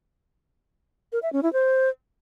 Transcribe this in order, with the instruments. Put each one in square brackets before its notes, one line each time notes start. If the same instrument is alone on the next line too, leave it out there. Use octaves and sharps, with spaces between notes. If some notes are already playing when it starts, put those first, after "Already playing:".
[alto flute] A#4
E5
C#4
E4
C5